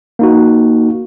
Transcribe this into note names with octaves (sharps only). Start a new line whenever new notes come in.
A#3 D#4 F#4